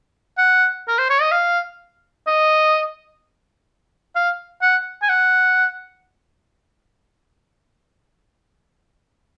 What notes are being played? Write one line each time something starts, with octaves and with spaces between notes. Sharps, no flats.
F#5
A#4
C5
C#5
D#5
F5
D#5
F5
F#5
G#5
F#5